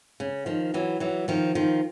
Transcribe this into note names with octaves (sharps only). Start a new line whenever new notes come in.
C#3
D#3 F3
E3 F#3
E3 F#3
D#3 F3
D#3 F3